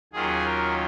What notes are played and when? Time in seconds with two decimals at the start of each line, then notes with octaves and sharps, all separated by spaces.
0.13 D#2 D#3 F#3 C#4 F4 G#4
0.45 A#4